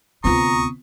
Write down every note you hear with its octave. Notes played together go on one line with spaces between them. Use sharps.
D2 C3 B3 C4 F4 A#5 C#6 D#6